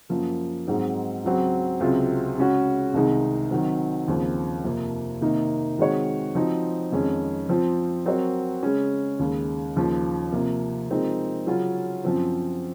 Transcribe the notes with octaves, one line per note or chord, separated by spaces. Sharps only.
F#2 F3 A#3
G#2 F#3 C4 D#4
C#2 C#3 F#3 C4 F#4
C#2 C3 F#3 C4 F4
C#3 G#3 C#4 F#4
C2 C3 D#3 G#3 D#4
D#3 F#3 C4
D#2 C#3 F3 C4
F2 C3 F3 A#3
C3 D#3 A#3 D#4
D#3 G#3 C4 F#4 C#5
F3 C4 D#4 F#4
F2 D#3 G#3 C#4
F3 C4 F4
F#3 C4 F#4 A#4 C#5
C#3 G#3 C#4
D#2 C#3 G#3
D#2 C#3 F3
C3 F3 A#3
F3 G#3 C4 D#4 A#4
C#3 F#3 C#4 F4
F#2 F3 C4 F4